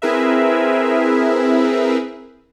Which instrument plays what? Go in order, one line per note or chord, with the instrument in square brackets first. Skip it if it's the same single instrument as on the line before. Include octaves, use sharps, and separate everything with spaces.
[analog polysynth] C4 E4 G#4 A#4 B4 E5